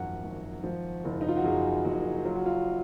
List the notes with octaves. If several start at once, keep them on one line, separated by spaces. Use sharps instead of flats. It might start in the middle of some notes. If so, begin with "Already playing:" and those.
Already playing: G#1 F#2 F3 F#5
G#1
F3
F#1
D#4
F4
F#4
F#2 G#4
F#1 F#4
F#3 F4
F#4
F4